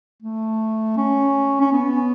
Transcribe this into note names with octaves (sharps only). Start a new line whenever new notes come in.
A3
C#4
C#4
B3